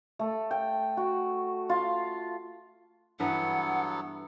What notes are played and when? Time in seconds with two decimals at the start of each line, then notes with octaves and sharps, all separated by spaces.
0.19 A3
0.51 G5
0.97 F#4
1.69 F4
3.20 G2 E3 F#3 B3 A4 B4 F#5